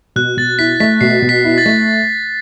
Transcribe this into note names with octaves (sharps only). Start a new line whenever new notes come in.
B2 F#6
B2 A6
E4 B6
A3 B6
B2 C7
B2
B6
E4
A6
A3